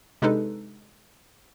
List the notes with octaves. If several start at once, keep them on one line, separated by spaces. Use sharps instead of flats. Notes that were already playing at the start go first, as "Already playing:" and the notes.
C3 G#3 D4 D#4 A4 B4